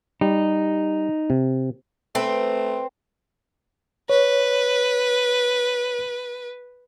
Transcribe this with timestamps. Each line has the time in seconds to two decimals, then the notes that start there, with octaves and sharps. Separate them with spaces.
0.21 G3 D#4
1.30 C3
2.15 A3 C4 B4
4.09 B4 C#5